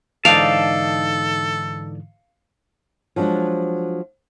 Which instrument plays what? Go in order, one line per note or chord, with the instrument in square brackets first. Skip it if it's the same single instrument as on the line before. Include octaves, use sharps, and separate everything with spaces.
[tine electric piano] G#2 D3 E3 [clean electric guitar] D#4 D5 A5 [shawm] A4 [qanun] F5
[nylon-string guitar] F3 F#3 G#3 D4